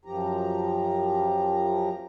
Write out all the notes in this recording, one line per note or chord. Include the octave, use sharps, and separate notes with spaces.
F#2 F3 G4 A#5